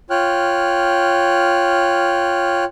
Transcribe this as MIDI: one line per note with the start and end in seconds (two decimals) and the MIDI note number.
0.10 2.65 65
0.10 2.65 73
0.10 2.65 79
0.10 2.65 89
0.10 2.65 90